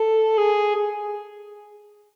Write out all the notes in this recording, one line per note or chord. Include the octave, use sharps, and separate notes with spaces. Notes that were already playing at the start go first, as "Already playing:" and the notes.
Already playing: A4
G#4
G#4